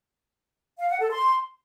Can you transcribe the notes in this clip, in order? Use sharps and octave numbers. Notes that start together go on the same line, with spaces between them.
F5
F#5
A4
C6